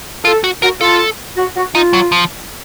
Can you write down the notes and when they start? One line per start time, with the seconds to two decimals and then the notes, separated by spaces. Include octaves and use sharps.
0.25 F4 A4
0.44 F#4
0.62 F#4 A#4
0.81 F4 A4
1.37 F#4
1.56 F#4
1.75 D#4 F4
1.93 F#3
2.12 F3